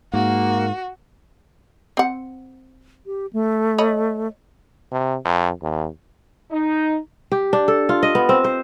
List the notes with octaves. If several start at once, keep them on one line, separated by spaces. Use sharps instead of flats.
G#2 A#3 F#4
C4 F#5
G4
A3
C#5 D#5 B5
C3
F2
D#2
D#4
G4
D4
A4
F4
D#5
B3
C4
C5